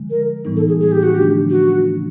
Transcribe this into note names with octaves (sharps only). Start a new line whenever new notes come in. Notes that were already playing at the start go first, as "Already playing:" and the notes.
Already playing: D3 F3 G#3
A#4
A2 E3 G3 B3 D#4
A4
G#4
G#4
G4
F#4
D3 F3 A3 D4 G4
F#4
C#3 E3 A3 C#4